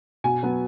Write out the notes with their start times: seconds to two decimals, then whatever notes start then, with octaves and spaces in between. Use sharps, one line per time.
0.24 B2 G#5
0.43 F#3 B3